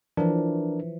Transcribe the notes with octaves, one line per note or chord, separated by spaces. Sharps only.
E3 F3 D4 A#4